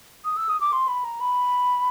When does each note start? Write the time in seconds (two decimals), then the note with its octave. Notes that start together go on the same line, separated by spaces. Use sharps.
0.25 D#6
0.37 E6
0.49 D#6
0.61 D6
0.73 C6
0.88 B5
1.04 A#5
1.21 B5